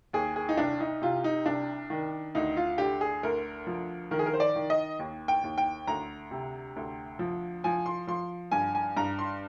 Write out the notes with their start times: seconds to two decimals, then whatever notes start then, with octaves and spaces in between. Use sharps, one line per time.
0.13 D#2 G#4
0.36 G#4
0.49 D#4
0.57 C2 D4
0.80 D#4
1.02 C3 F4
1.24 D#4
1.46 C2 D4
1.90 D#3
2.35 D2 D#4
2.57 F4
2.78 D3 G4
3.01 G#4
3.23 D2 A#4
3.67 F3
4.11 D#3 A#4
4.19 G#4
4.26 A#4
4.34 C5
4.40 D5
4.56 D#3
4.70 D#5
4.99 D#2
5.28 G5
5.44 D#2
5.58 G5
5.87 D2 A#5
6.31 C3
6.76 D2
7.19 F3
7.64 F3 G#5
7.86 C6
8.07 F3 C6
8.52 G2 G#5
8.75 G#5
8.97 G2 A#5
9.19 C6